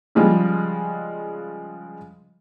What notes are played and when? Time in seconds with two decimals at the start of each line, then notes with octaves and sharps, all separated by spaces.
0.15 C#3 F3 G3 G#3